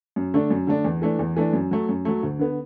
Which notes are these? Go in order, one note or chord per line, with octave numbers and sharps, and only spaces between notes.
F#2
D3 A3 D4
F#2
D3 A3 D4
E2
E3 A3 D4
E2
E3 A3 D4
F#2
F#3 A3
F#2
F#3 A3
D2
D3 B3